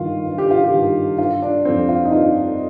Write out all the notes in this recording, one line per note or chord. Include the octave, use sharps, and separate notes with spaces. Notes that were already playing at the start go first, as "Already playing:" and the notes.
Already playing: G1 G2 D#3 F4
G1
G4
F4
G4
G2 D#3
G1 F4
D4
F2 D3 C4
F4
D#4
G1 F4